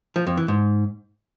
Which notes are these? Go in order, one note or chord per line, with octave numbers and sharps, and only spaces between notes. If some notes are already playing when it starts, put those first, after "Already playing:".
F3
F2
E3
G#2